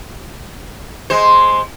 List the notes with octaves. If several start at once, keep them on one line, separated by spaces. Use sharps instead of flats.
G#3 C5